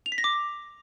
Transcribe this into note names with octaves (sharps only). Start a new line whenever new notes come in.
F7
B6
A#6
D6